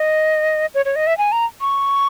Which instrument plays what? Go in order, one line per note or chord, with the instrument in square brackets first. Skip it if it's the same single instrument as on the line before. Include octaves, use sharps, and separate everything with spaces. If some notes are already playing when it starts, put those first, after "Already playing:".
Already playing: [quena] D#5
C#5
C#5
D#5
E5
G#5
A#5
C#6